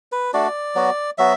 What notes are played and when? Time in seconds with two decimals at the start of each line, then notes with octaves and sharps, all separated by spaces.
0.12 B4
0.33 A3 D4 F#4 D5
0.75 F#3 B3 F#4
1.18 F#3 B3 F#4 E5